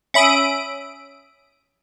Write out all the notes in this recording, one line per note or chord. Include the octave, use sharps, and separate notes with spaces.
C#4 E5 B5 D#6 D7